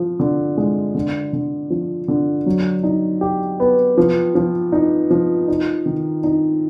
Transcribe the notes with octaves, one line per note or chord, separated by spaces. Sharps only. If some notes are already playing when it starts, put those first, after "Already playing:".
Already playing: F3
D3
G#3
D3
D3
F3
D3
F#3
D#4
G4
B3
F3
F3
D#4
F3
D#4
D#3
D#4